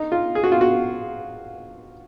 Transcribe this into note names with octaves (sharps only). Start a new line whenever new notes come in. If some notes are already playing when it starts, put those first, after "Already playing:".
Already playing: D#4
F4
G#4
F#4
F4
F#4